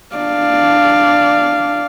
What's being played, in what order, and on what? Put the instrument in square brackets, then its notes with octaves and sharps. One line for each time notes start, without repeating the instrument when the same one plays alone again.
[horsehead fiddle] D4 D5 [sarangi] F5